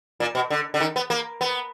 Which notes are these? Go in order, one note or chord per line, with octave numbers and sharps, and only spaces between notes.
A#2
B2
D3
D3
D#3
B3
A#3
B3